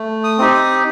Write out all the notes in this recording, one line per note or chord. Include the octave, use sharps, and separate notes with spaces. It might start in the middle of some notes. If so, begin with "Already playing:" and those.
Already playing: A3
D#6
C4 D#4 G4
D#6